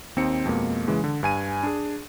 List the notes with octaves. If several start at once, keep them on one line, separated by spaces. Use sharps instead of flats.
D#2 C4 D#4 C#7
F2 B2 G#3 A#3
C#3 E3 G#3
D3
G2 G#5 D#7
D4 G#4